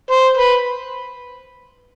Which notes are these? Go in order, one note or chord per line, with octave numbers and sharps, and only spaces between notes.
C5
B4